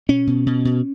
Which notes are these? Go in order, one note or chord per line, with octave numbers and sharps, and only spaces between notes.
B2 C#4
B2
B2
B2